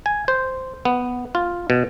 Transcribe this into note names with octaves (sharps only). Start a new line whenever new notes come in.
G#5
C5
B3
F4
B2